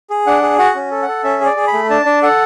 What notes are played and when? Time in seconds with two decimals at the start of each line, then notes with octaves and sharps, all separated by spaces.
0.10 G#4
0.27 D4 F#5
0.42 G#4
0.58 F#4 F#5
0.75 C#4
0.91 A4
1.02 F#5
1.08 A4
1.24 C#4 E5
1.41 G#4 D5
1.56 G#4
1.67 B5
1.73 A3
1.90 D4 A5
2.06 D4
2.23 A4 F#5